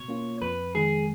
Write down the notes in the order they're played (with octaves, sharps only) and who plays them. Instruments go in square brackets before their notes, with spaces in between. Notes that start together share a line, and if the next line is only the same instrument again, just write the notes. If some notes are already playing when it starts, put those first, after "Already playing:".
Already playing: [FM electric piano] B2 [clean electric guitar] C#5
[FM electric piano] A#3 C#4 F4
[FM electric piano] F2 [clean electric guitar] B4
[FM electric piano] D#3 G#3 [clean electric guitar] G#4